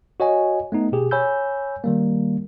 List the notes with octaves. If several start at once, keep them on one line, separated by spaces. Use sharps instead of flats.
F#4 C#5 D#5 G#5
A3 B3 D#4
B2 G4 G#4
C#5 G#5 B5 E6 G6
D#3 G3 A#3